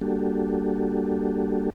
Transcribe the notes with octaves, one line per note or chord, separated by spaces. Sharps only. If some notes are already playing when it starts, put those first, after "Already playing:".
G3 A#3 D4 F#4 G4 A4